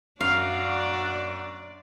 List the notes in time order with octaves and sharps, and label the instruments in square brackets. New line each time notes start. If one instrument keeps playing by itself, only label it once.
[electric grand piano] F#2 [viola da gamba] D4 D5 [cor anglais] F#4 [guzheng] F5